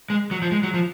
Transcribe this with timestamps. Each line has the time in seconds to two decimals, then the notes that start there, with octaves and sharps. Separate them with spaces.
0.10 G#3
0.31 F#3
0.42 F3
0.52 G#3
0.63 F#3
0.74 F3